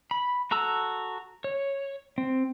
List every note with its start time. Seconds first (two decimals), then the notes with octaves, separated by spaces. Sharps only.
0.11 B5
0.51 F#4 A4 A#5 E6
1.44 C#5
2.18 C4